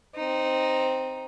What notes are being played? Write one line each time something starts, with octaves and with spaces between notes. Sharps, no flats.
C4 D#4